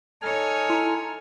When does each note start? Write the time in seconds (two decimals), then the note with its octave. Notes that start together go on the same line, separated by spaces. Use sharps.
0.22 D#4 A4 C#5 G#5 F6
0.70 E4 A#5 C6